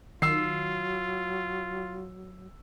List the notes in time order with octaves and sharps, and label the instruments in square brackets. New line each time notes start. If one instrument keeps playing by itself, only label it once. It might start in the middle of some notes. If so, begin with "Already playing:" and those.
[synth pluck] D#3 [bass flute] F#3 [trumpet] F4 [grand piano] E6 C7